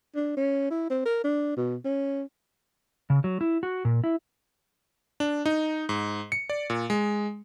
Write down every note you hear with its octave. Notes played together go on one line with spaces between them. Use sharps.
D4
C#4
E4
C4
A#4
D4
B2
C#4
C#3
F#3
E4
F#4
A#2
E4
D4
D#4
G#2
C#7
D5
A#2
G#3